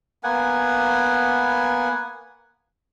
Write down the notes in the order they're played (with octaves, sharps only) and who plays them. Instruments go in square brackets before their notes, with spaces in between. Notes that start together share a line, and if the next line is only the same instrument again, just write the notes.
[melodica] A#3 B3 F#5 G#5